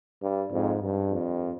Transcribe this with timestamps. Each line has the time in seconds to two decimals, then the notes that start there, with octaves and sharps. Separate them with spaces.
0.22 G2
0.52 F2 G#2
0.82 G2
1.11 F2